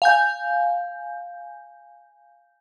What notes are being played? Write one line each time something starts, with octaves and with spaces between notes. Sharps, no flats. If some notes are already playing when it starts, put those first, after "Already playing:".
F5 G#5 G6